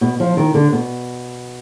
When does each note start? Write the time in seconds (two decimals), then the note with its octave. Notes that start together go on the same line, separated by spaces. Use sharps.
0.01 B2
0.20 F3
0.37 D#3
0.54 D3
0.72 B2